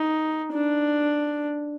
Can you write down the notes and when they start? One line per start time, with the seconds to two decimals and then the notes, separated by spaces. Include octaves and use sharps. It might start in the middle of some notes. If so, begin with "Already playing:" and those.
Already playing: D#4
0.53 D4